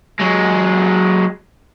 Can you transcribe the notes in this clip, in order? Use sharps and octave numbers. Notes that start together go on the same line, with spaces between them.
F#3 G#3